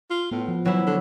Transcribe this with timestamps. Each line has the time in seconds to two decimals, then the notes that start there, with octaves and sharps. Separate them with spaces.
0.10 F4
0.32 A2 B3
0.48 F3
0.65 E3 F#3 E4
0.87 D3